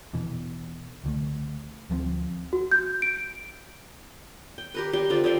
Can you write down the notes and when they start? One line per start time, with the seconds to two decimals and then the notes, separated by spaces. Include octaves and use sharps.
0.13 E1 B2 E3
1.04 C#2 D3 A3
1.90 D2 F3 G#3 C4
2.53 F#4
2.71 G6
3.02 D7
4.58 G5
4.74 G4 A#4 B4
4.93 G3 G4 G5 C6
5.10 D3 C4 F4 D5
5.24 D3 G3 G5 C6